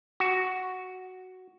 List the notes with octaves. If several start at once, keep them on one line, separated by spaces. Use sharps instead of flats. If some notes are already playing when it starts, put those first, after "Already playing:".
F#4